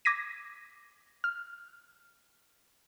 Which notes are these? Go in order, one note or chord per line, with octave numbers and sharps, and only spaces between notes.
D6 G#6 A#6 B6 D#7
F6